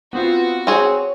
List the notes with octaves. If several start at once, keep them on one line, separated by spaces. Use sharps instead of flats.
B3 C4 F4 F#4
C4 G#4 C#5